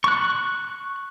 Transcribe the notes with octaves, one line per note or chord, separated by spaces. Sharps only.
C#6 F#6